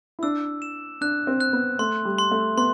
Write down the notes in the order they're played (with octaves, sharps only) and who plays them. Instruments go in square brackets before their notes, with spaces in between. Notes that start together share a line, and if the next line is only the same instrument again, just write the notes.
[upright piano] E4
[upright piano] D4 [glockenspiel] E6
[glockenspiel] E7
[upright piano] D4 [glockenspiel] F#6
[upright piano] C4
[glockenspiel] F#6
[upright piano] B3
[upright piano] A3 [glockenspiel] C6
[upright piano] G3
[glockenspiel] C6
[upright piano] A3
[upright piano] B3 [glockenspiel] C6